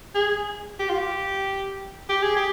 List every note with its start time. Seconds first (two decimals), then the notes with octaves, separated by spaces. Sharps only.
0.15 G#4
0.80 G4
0.89 F4
0.99 G4
2.09 G4
2.22 G#4
2.36 G4